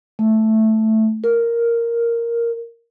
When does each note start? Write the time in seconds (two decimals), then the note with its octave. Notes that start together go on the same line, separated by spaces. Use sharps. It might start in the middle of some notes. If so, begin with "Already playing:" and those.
0.19 A3
1.24 A#4